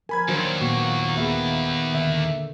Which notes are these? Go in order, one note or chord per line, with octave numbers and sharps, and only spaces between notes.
F3 A#4 G#5 B5 G#6
D#2 F#3 D4 C5
A#2 A#3 B3 F#4
A#3 B3 G#4 E5
D3 D#3 E5